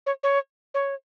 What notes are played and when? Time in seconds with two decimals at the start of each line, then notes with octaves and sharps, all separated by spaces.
0.06 C#5
0.23 C#5
0.74 C#5